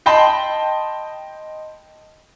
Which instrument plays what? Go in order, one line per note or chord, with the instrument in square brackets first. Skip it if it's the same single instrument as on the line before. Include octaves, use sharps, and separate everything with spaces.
[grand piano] D#5 G5 A5 B5 C6